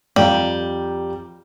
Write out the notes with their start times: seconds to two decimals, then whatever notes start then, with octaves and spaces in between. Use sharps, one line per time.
0.16 F2 G3 F5 A#5